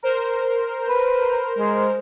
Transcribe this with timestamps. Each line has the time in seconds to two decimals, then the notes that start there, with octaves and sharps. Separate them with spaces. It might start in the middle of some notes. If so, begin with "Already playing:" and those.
0.03 A#4 C5
0.88 B4
1.58 G#3